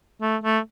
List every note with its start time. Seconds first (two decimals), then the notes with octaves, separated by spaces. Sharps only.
0.22 A3
0.44 A3